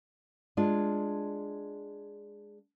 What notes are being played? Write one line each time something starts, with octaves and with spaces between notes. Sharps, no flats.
G#3 D4 F4